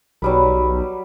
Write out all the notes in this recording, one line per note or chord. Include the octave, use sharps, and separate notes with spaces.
B1 F#3 G3 B4